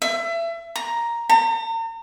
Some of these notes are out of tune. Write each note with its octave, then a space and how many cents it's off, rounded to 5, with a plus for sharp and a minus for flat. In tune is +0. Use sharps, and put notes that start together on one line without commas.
E5 +30
A#5 +5
A#5 -40